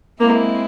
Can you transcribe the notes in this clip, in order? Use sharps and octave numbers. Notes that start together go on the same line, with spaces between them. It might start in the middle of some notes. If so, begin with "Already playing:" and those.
G#3 A#3 C4 E4